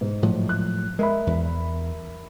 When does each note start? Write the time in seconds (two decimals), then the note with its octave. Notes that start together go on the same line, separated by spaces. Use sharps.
0.01 G#2
0.23 A2 F3 F#3
0.49 F#6
0.99 G#3 A#4 E5 B5
1.27 E2